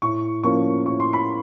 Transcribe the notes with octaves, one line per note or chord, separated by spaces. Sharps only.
A2 C#6
F3 A#3 C#4 C#6
A2 C#6
C6
B5